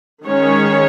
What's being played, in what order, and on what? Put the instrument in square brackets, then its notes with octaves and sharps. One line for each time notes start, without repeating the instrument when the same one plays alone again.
[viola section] D#3 G#3 C#4 C#5